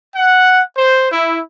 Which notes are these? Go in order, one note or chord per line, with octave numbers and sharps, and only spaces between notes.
F#5
C5
E4